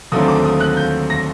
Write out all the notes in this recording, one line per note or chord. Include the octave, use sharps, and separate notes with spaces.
D#2 D3 F#3 A3 C4 D#6
D6
D#6
F#6
G6
A#6